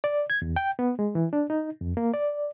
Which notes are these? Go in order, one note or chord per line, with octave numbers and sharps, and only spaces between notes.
D5
G#6
E2
G5
B3
G#3
E3
D4
D#4
F2
A#3
D5